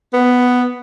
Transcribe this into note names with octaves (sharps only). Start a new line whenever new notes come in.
B3